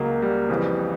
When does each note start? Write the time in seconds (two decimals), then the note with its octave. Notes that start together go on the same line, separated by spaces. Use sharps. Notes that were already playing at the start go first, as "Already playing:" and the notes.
Already playing: C#2 C#3 F#3 A#3
0.22 G3
0.49 F2 C#3 E3